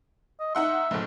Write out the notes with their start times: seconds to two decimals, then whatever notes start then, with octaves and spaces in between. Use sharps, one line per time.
0.40 D#5
0.55 D#4 E5 F#5 C6
0.91 F#1 A2